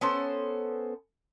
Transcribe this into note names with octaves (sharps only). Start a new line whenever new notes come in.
B3 C#4 A4 C5